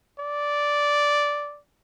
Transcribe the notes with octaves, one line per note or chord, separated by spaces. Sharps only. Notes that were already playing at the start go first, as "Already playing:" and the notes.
D5